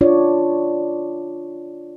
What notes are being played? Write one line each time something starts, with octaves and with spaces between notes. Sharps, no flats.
D4 F4 C#5 D5